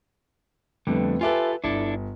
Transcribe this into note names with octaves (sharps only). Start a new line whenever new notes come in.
F2 D3 G3 A3 B3
F4 G4 A4 B4 E5 G#5
G1 D4 E4 A4